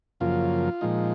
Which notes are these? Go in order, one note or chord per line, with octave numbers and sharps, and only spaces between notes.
F#2 C#3 F3 A#3 F4
A#2 F3 G#3 D#4